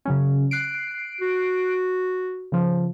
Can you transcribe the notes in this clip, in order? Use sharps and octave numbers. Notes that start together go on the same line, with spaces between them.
C#3 F#3 C#4
F#6 C7 D7
F#4
C#3 F3